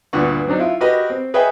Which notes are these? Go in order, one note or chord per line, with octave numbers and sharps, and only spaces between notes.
D2 G2 A#2 B3 F#5 C#6
F#3 C4 D4 D#4
E4 F4
F#4 G4 A#4 B4 D#5 F#5
C4
G#4 B4 C#5 D#5 E5 G5